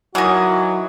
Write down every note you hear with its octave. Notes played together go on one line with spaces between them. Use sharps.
D#3 E3 F#3 F#4 F#5 G#5 D#6